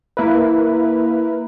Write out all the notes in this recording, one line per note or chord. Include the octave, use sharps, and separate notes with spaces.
A#3 E4 A#4 B4